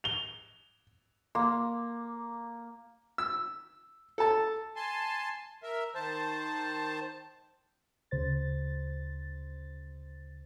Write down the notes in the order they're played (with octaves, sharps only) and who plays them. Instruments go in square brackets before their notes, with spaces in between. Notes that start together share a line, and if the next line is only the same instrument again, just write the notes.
[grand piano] F7 G7
[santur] A#3 [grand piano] C6
[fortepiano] E6
A4 A5
[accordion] G#5 A5 C6
A#4 E5
D#3 C5 A5
[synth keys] D2 C#3 C5 A6